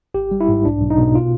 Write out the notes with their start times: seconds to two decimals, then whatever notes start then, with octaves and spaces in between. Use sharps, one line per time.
0.14 G#1 G4
0.31 G3
0.41 E4
0.48 G#2
0.65 B1 D4
0.82 B1
0.90 D#4
0.98 B2
1.15 F4